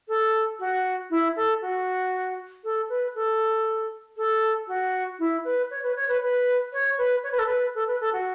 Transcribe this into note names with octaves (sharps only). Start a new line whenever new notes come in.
A4
F#4
E4
A4
F#4
A4
B4
A4
A4
F#4
E4
B4
C#5
B4
C#5
B4
B4
C#5
B4
C#5
B4
A4
B4
A4
B4
A4
F#4